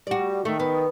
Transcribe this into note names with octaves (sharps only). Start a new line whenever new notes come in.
G3 F#4 D5
D#3 A3
B3